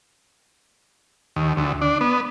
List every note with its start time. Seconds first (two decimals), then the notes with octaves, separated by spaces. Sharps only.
1.36 D#2
1.57 D2
1.82 D4
2.01 B3